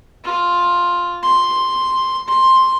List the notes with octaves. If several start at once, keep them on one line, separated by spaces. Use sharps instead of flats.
F4
C6
C6